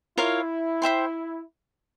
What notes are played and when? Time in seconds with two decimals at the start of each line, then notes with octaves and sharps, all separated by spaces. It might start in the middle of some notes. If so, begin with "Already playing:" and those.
0.17 E4 F4 A#4 C#5 F5
0.82 C5 E5 G5 C6